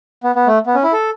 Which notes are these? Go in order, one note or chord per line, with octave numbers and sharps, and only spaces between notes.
B3
B3
A3
B3
C#4
E4
A4